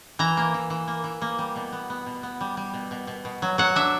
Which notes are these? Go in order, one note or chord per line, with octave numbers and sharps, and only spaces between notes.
E3 A#5
A#3
E3
E3
A#3
E3
A#3
G3
B2
B3
B3
B2
B3
G3
G3
B2
B2
B2
B2
F#3
F#3 F#5
D4 E5